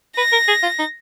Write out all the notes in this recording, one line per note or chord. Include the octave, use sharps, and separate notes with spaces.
B4 A#6
A#4
G#4
F4
D#4